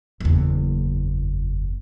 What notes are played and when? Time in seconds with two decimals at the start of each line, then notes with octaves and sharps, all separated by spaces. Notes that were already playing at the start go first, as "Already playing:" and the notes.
0.20 F#1 E2